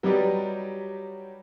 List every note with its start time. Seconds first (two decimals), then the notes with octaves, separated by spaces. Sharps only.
0.03 F#3 G3 D#4 G4 B4 D5